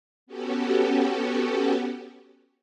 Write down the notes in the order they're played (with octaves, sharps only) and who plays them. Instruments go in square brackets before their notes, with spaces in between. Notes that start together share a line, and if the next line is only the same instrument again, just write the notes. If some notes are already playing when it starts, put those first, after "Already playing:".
[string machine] B3 C#4 F#4 G4 A4